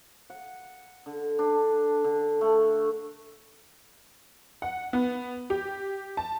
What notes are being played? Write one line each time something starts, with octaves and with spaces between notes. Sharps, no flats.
F#5
D3
D4
D3
A3
F#5
B3
G4
A5